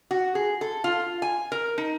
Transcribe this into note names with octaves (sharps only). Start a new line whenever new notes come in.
F#4
G#4
A4
F4
G#5
A#4
D#4